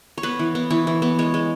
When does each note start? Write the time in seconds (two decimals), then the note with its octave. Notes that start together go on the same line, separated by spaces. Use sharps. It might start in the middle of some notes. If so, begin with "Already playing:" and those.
0.18 C#5
0.23 B3 B4
0.39 E3
0.55 B3
0.70 E3 C#5
0.87 E3
1.02 B3
1.19 G#3 C#5
1.34 G#3